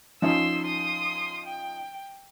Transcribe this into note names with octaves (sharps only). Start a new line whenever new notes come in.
F3 C#4 D#4 C6 E6
C6 D#6
G5